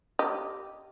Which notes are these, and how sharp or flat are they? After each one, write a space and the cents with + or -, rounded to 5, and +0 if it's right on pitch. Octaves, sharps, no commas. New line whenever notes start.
G4 -10 D#5 +0